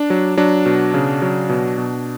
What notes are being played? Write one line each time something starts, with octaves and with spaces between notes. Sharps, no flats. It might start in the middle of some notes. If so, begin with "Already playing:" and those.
Already playing: D4
F#3
F#3 D4
B2
C#3
F#3
B2
B2